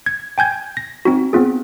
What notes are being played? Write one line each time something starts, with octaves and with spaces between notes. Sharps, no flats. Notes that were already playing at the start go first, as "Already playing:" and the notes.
G#6
G5 G#5 G6 G#6
A#6
C4 D#4 F#4
B3 C4 F4 G#4